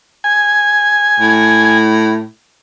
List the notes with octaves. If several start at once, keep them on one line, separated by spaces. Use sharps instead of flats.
G#5
A2